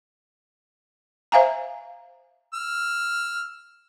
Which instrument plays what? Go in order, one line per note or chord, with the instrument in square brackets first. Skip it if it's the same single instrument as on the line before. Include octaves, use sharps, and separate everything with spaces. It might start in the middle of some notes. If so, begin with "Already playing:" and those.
[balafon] C5 E5 F5 G#5 A#5
[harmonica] E6 F6